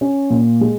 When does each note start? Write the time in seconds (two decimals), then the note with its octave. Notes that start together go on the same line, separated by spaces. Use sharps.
0.01 C#4
0.30 A#2
0.61 G#3